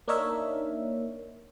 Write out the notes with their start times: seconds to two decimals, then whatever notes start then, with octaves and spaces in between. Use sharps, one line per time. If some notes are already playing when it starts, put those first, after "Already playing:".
0.08 A#3 D4 D#4 A#4 C#5 E5